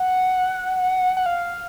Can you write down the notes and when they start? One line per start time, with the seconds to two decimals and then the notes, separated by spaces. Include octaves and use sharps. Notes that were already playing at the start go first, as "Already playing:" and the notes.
Already playing: F#5
1.17 F#5
1.26 F5